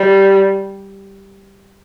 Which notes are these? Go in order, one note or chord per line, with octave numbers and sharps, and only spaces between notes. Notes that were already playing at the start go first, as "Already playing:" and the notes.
Already playing: G3